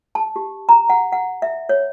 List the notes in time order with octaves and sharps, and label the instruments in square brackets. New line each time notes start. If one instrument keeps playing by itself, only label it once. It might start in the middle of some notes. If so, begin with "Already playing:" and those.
[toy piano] A5
G4
A#5
F#5
F#5
E5
C#5